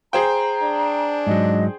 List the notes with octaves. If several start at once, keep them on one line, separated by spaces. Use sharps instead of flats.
G#4 C5 G5 A#5
D4
G#2 F#3 D#5